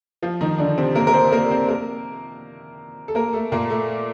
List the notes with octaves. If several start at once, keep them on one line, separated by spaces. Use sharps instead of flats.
F3 F4
D#3 D#4
D3 D4
C3 C4
A#3 A#4
A#4
C4 C5
A#3 A#4
C4 C5
A#3 A#4
A4
A#3 A#4
A3 A4
A#2 A#3
A3